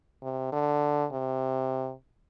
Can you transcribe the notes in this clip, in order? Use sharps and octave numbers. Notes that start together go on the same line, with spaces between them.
C3
D3
C3